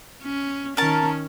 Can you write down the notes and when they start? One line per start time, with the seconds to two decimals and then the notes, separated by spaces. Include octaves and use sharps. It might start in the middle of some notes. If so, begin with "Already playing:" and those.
0.23 C#4
0.77 D#3 C#4 A#4 A5